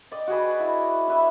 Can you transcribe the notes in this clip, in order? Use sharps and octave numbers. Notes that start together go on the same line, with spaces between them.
D5 D#5 G5
F#4 G#4 B4
E4
E4 B4 E5